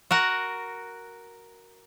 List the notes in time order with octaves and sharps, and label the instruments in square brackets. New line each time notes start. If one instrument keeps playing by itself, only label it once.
[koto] F#4 A#4 F#5